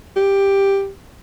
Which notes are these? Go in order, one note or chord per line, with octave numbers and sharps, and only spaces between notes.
G4